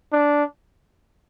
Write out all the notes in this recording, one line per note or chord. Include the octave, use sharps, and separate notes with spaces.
D4